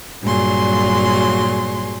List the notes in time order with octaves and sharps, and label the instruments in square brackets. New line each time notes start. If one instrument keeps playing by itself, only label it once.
[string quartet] G2 A#2 F#3 G#4 C6